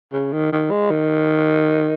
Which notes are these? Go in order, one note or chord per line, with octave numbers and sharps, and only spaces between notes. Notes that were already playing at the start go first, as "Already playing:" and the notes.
C#3
D#3
D#3
G#3
D#3